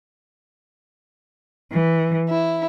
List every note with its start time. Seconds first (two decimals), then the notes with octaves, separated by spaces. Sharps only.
1.72 E3
2.29 E4